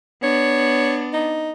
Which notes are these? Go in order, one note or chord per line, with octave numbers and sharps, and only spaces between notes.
B3 D4 C#5
D#4